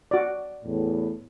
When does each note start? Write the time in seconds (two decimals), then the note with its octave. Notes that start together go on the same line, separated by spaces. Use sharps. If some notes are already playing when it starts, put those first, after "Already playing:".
0.11 F#4 D5
0.65 E2 A2